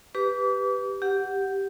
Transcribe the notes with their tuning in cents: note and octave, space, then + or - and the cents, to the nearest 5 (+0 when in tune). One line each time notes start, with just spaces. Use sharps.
G4 +0 B4 +5 D6 -35
G4 +0 F#5 +0